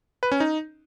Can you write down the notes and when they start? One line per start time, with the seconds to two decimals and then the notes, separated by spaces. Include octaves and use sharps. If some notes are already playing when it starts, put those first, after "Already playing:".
0.23 B4
0.32 C#4
0.40 D#4